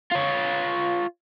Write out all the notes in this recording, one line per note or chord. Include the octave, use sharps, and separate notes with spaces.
F4 C#5